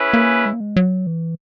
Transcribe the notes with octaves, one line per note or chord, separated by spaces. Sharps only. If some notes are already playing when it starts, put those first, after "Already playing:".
Already playing: C#4 E4 G#4 B4
A#3
G#3
A#3
G#3
F#3
E3